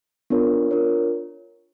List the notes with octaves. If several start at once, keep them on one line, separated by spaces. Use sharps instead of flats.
B3 D4 F4 A#4 C#5
D4 F4 A#4 C#5